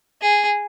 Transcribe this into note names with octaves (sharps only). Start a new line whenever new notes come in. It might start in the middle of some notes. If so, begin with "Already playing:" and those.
G#4